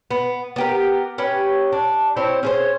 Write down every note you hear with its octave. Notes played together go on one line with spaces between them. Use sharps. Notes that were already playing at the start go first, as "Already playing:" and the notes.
B3
B3 G4 A#4
C#4 G4 B4
D4
C4 E4 C5 C#5
C#4 G#4 C5